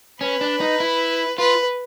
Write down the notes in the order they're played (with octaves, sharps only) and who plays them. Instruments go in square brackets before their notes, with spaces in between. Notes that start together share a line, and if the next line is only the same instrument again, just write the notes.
[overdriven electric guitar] C#4 [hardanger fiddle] B4
[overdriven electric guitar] D4
D#4
E4
[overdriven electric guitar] F4 [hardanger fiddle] B4